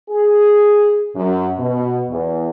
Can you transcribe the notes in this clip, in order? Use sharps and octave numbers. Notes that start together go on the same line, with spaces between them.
G#4
F#2
B2
E2